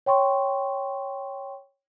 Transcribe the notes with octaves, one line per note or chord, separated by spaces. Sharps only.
C#5 G5 C6 C#6